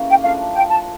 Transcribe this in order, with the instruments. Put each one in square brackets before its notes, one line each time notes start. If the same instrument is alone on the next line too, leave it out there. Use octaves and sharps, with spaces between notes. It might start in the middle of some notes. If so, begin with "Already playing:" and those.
Already playing: [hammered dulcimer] C#3 E3 A#3 C#4 G4
[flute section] G5
[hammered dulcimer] F3 A3 D4 [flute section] F5
[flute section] G5
A5